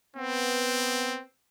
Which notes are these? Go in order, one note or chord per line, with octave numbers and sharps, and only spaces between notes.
B3 C4